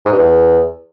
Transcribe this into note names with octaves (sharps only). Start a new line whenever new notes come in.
G#2
G2
E2